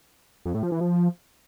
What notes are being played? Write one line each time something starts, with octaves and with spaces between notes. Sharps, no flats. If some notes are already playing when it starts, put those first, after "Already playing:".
F2
A2
F3
E3
F3